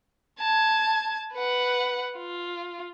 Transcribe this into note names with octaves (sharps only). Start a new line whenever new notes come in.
A5 G#6
B4 F#5
F4